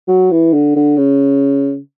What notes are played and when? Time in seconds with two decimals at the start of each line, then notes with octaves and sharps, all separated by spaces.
0.08 F#3
0.31 E3
0.53 D3
0.76 D3
0.97 C#3